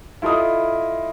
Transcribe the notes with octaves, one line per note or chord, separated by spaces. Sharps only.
E4 F4 A4 D#5 D#6